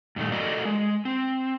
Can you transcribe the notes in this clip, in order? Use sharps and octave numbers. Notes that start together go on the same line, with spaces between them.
G2 A#2 D#3 A3
F#4 A4 A#4 D5 D#5
G#3
C4